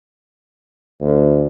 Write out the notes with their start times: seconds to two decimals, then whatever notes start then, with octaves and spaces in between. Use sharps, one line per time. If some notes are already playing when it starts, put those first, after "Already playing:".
1.01 D2